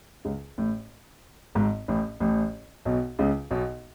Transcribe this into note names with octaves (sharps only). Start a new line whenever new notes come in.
C#2 C#3
A1 A2
G#1 G#2
A1 A2
A1 A2
B1 B2
C#2 C#3
B1 B2